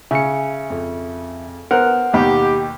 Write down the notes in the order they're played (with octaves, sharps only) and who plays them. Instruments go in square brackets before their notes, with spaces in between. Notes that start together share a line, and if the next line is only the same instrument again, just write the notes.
[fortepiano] C#3 [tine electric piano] E5 C#7 [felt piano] G#5
[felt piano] F2
[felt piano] B3 [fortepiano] A#4 C5 F#6 [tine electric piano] F#5
[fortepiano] D#2 B2 [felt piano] D#4 B5 [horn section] G4